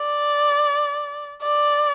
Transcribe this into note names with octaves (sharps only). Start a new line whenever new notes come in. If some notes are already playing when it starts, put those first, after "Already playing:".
Already playing: D5
D5